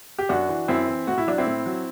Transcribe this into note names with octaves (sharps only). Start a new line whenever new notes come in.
G4
F#2 D4 F#4
E3
F#2 C4 E4
E3
A2 F#4
E4
F#3 D4
C4 E4
A2
F#3